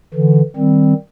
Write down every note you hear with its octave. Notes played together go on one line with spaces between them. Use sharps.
D3 E3
D#3 G3 C4